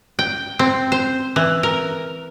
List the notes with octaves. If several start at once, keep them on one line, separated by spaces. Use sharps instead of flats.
G5
C4
C5
E3
A#4